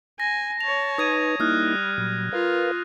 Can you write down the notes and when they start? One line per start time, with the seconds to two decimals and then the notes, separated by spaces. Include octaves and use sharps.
0.20 G#5 A#6
0.61 C#5 A5 F7
0.98 D#4 B4 D#6 G#6 D#7
1.40 G3 A#3 D#4 E4 D#6 F6 F#6
1.98 A#2 F#3
2.33 F4 A#4 B4 F5